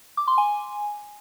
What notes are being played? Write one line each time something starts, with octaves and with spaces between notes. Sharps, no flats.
D6
C6
G#5